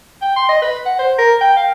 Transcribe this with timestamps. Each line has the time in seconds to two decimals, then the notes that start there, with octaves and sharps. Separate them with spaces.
0.22 G5
0.36 C6
0.49 D#5
0.62 B4
0.86 F#5
0.99 C5
1.19 A#4
1.41 G5
1.56 F5